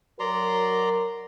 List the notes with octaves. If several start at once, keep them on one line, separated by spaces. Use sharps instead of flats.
F#3 F#4 A#4 D5 A#5 C6